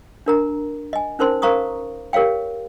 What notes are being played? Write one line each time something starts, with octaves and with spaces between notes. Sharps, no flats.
D4 A#4 A#5
D#5 G#5
C#4 D#4 A#4 C5 C6
A#4 C5 F5 A#5 C#6 D#6
G4 A#4 C#5 F5 G5